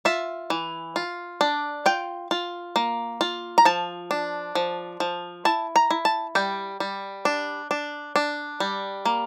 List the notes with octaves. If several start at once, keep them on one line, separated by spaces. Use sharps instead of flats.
F4 E5
E3
F4
D4
F4 G5
F4
A#3
F4
A#5
F3 A5
D4
F3
F3
E4 A5
A#5
E4
A5
G3 G5
G3
D4
D4
D4
G3
A#3